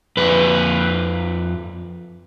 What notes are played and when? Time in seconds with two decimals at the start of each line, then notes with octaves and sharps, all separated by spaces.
0.17 F2 B4